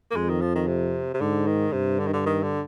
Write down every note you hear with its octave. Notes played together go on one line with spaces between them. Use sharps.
A#3
F2 G#3
D#3
F3
D#3
C3
C3
G#2 D3
D#3
G2 C3
D3
D#3
D3
D#3
D3